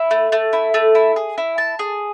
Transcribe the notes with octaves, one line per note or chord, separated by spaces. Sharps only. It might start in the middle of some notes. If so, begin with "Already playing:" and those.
Already playing: E4
A3
A3
E4
A3
E4
G#4
E4
A5
G#4